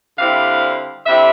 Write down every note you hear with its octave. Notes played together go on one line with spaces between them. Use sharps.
D3 G3 C4 E4 F5
D3 G3 C4 E4 E5